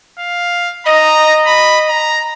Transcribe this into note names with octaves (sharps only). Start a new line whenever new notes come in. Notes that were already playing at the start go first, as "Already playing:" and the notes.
F5
D#5 A#5
B5
A#5